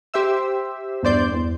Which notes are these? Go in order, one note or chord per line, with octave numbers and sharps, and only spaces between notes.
G4 C5 E5 E6
E2 G2 C5 D5 G6
E2